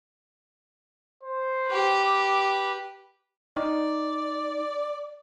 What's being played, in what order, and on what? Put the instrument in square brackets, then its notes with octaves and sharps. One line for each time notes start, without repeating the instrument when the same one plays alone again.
[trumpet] C5
[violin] G4 B4
[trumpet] D6
[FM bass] D#4 [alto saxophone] D5